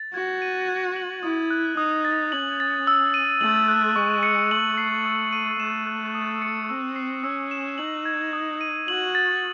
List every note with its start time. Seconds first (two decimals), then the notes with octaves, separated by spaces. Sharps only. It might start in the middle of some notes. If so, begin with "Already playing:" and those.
Already playing: A6
0.14 F#4 G#6
0.42 D#7
0.68 G#6
0.96 F#7
1.23 E4 D#6
1.50 F#6
1.77 D#4 D#6
2.05 A6
2.32 C#4 F#7
2.60 A6
2.87 E6
3.14 D#7
3.41 A3 F#7
3.68 F#6
3.96 G#3 C#6
4.23 C#7
4.51 A3 F#7
4.78 C7
5.05 E6
5.33 D#7
5.59 A3 E7
5.87 F#6
6.15 D#6
6.42 C#7
6.69 C4 E6
6.96 C7
7.23 C#4 E6
7.51 E7
7.78 D#4 F#7
8.05 G#6
8.33 D#6
8.61 D#7
8.88 F#4 F#7
9.15 A6